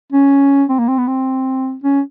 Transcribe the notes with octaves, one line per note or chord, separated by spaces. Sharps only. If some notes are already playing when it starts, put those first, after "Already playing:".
C#4
C4
A#3
C4
B3
C4
C#4